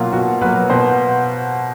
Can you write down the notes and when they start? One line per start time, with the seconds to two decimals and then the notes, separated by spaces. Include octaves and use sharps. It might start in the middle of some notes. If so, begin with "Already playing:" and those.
Already playing: B2 F#3 A#3 F4
0.12 B2 F#4
0.41 F#3 A#3 B4
0.70 B2 C5